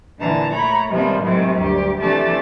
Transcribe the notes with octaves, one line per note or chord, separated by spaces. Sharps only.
A#2 D3 E3 A5 A#5
A3 C#5 A#5 B5
C3 D#3 F3 G3 G#3 B3
A2 C3 D#3 F#3 G#3
D2 G2 G4
C3 E3 A3 D4 G4 A5